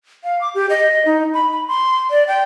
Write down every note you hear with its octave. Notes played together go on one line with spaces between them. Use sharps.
F5
D6
G4
D#5
D#4
B5
B5
C6
D5
G5